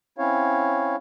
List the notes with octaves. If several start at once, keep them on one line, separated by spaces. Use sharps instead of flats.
C4 C#4 E4 C#5 F5